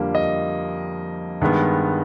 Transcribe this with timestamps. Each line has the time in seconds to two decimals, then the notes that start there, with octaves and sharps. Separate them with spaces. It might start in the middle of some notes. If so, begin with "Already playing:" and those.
Already playing: F2 D3 G3 A#3
0.15 D#5
1.41 G2 D#3 G#3 B3